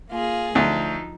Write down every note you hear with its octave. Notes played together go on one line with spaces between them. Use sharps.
A#3 F4 G#4
D2 F3 D#4